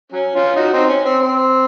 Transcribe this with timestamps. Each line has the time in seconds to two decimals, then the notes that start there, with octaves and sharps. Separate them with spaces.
0.12 F#3 C#4
0.35 C#4 F4
0.56 D#4 F#4
0.72 C4 D#4
0.88 C#4
1.05 C4
1.22 C4